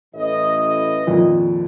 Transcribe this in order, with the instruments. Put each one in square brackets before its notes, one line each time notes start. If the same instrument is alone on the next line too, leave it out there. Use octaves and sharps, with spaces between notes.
[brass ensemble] A1 E3 D#5
[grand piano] G#1 F2 A#2